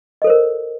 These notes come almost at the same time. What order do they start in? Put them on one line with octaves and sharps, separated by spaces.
D#5 A4 C5 A#4